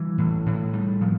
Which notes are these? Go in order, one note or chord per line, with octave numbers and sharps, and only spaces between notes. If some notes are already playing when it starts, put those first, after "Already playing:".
Already playing: E3 G3
A2
A2
G3
F3